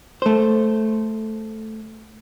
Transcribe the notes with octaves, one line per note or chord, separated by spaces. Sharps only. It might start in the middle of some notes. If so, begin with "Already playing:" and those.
A3 C5